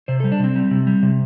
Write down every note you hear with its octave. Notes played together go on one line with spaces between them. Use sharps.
C3 C5
A4
G3
D4
C3 C4
G3
C3
G3
C3